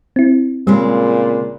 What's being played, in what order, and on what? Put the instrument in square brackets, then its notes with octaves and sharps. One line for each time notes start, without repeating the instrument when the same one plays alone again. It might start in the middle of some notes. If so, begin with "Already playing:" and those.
[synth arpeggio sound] C4 E4
[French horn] A#2 [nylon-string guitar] C#3 G#3 C4 [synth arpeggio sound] G3